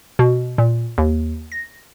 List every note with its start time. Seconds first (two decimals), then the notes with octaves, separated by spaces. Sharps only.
0.19 B2
0.58 A#2
0.98 D#2
1.52 A#6